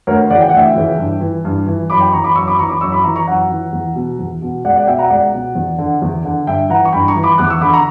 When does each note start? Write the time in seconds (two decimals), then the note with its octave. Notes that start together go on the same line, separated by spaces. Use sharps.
0.07 D2 A#4 C#5
0.30 C#3 E3 D5 F#5
0.41 G5
0.49 F#5
0.53 D2 E5 G5
0.75 C#3 E3
0.98 G2
1.21 E3
1.45 G2
1.67 E3
1.90 F#2 B5 D6
2.01 G5 B5
2.13 E3 A#5 C#6
2.24 B5 D6
2.35 F#2 C#6 E6
2.47 B5 D6
2.59 E3 A#5 C#6
2.69 B5 D6
2.81 F#2 C#6 E6
2.92 B5 D6
3.04 E3 A#5 C#6
3.16 A#5 C#6
3.27 F#2 F#5 A#5
3.50 E3
3.72 E2
3.95 B2
4.19 E2
4.42 B2
4.64 C#2 D5 F#5
4.76 D5 F#5
4.87 B2 E5 G5
4.98 F#5 A#5
5.09 C#2 D5 F#5
5.33 B2
5.55 E2
5.78 D3
6.02 E2
6.25 D3
6.47 G2 E5 G5
6.69 E3 F#5 A#5
6.85 C#6
6.93 G2 G5 B5
7.08 A#5 C#6
7.15 E3
7.23 B5 D6
7.38 E2 D6 F#6
7.50 C#6 E6
7.61 D3 B5 D6
7.73 A#5 C#6